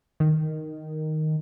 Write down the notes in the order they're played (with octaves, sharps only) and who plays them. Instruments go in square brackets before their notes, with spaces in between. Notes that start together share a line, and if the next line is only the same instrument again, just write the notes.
[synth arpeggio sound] D#3